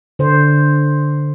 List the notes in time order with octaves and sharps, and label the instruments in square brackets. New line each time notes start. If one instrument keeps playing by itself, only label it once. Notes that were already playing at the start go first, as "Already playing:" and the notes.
[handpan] D3 C5